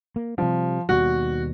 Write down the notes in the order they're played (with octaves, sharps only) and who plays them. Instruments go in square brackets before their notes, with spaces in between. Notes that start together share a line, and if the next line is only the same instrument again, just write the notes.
[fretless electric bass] A#3
[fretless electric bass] C3 G3 [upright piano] F3
[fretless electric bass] D#2 B2 G3 [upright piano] F#4